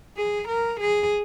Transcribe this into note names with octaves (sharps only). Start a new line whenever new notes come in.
G#4
A#4
G#4